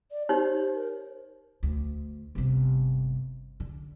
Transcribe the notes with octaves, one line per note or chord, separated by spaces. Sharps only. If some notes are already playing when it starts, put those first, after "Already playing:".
D5
D#4 G4 C5 C#5
A#4
D2
G1 C3
D3